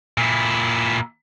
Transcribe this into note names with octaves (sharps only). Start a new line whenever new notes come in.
A#2 E4